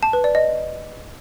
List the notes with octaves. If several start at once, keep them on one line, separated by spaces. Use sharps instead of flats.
A5
B4
D5
D#5